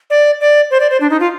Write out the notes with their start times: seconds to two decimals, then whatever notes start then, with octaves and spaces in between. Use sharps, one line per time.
0.10 D5
0.41 D5
0.71 C5
0.80 D5
0.90 C5
1.01 D4
1.10 D#4
1.20 F4